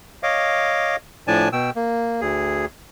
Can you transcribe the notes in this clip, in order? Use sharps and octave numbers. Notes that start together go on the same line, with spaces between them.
C#5 D#5 F5 D6
A2 F3 D4 D5 G#5 A5
B2 G5 E6
A#3
D2 G#4